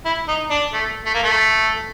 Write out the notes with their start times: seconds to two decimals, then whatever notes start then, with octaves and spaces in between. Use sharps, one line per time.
0.05 E4
0.28 D#4
0.50 D4
0.73 A3
1.06 A3
1.14 A#3
1.23 A3